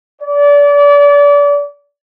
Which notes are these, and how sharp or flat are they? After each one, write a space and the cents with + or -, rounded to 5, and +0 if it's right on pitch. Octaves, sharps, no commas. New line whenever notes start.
D5 -30